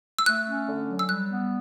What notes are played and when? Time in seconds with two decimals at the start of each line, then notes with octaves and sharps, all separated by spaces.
0.19 E6
0.26 A3 F#6
0.47 C#4
0.68 D3
0.88 F#3
0.99 E6
1.09 G3 F#6
1.30 B3